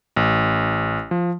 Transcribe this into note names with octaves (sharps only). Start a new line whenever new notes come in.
A1
F3